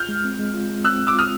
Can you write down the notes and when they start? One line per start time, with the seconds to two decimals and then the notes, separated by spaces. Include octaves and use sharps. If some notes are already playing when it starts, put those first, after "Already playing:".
Already playing: F4 F6 G6
0.09 G#3
0.24 C4
0.39 G#3
0.54 F4
0.70 G#3
0.84 C4 E6 F#6
1.00 G#3
1.07 D6 E6
1.15 F4 D#6 F6